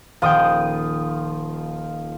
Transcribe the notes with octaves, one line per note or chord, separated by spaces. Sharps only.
D#1 F3 F4 G5 D#6